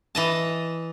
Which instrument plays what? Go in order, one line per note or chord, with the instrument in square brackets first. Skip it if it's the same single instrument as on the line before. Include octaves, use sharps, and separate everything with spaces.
[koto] E3 D#5 A5